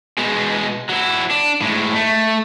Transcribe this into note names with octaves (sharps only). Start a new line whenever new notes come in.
B2 G#3
F#3 E4
D4
A2 G#3
A3